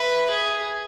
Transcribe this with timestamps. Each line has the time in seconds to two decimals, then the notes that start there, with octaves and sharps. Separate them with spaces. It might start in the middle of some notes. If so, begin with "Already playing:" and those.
Already playing: B4 E5
0.30 G#4